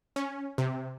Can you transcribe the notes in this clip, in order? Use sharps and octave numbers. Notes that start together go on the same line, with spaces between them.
C#4
C3